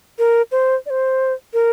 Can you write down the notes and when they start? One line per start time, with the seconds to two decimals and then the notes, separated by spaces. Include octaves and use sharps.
0.19 A#4
0.52 C5
0.86 D5
0.90 C5
1.54 A#4